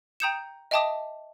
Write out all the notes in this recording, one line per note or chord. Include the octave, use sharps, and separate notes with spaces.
G5 A#5 D#6 G6 C#7 E7
D#5 E5 G5 A5 D6 D#6